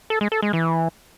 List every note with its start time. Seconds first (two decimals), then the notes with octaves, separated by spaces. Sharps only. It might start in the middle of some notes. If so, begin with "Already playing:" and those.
0.10 A4
0.21 G#3
0.32 A4
0.42 G#3
0.53 E3